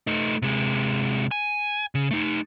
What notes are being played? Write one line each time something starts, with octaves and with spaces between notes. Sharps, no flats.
A3 D#4
C3 G#3
G#5
C#3
A3 D#4